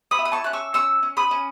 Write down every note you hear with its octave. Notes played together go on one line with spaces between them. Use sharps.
B5 D#6
E4
D#6
A5 C#6
C#4 F#6
C#6 E6
C#4 C#6 E6
C#4
B5 D#6
C#4